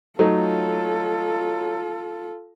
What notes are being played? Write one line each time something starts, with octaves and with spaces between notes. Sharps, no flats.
F#3 A3 D#4 F4 A4